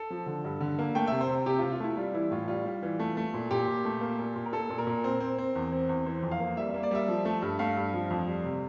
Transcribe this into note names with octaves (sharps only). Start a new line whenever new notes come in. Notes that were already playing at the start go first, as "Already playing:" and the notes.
Already playing: A4
F3
D3
G2
D3
A#3
A3 G5
C3 E5
C5
C3
C3 G4
C3 F4
F4
A3 E4
G3 F4
E3 E4
A2 F4
G3 F4
G3
E3
A3
A3
A#2
A#2 G4
A#2
A3
A#3
A#2
A#2
A#4
A#2 A4
A#2
A#4
A#2
C4
C4
C4
E2
C4
E2
E3 C5
F2
F5
A#3
G3 E5
A#3 E5
D5
G3 E5
F3
A3
G2
A3 F5
G2
F3
F2
G3
C3